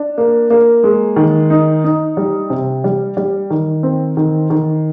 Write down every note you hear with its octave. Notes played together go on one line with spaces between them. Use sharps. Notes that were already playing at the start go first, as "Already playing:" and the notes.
Already playing: D4
A#3
A#3
G#3
D#3
D#4
D#4
G3
C3
G3
G3
D#3
C4
D#3
D#3